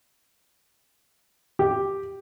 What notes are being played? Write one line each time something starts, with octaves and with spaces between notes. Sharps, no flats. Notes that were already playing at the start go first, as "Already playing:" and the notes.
G4